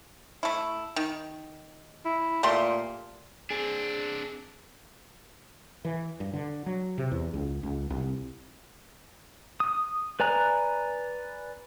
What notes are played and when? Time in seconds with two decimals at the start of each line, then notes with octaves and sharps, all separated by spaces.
0.43 A3 E4
0.96 D#3
2.05 E4
2.43 A#2 A3 G4 C6
3.51 C4 D4 G#4
5.85 E3
6.20 G2
6.34 D3
6.66 F#3
6.98 C3
7.11 E2
7.34 C#2
7.63 C#2
7.90 C2
9.60 D#6
10.20 B4 D5 G#5 A#5 F#6